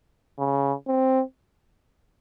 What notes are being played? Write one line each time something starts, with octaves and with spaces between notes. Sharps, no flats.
C#3
C4